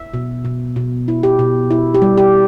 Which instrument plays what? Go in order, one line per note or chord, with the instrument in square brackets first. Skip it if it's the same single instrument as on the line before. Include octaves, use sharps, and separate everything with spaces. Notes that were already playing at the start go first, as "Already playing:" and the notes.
Already playing: [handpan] E5
B2
B2
B2
E4
G4
B2
E4
G4
G3
G4